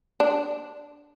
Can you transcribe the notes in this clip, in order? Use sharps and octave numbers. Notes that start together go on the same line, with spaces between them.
D4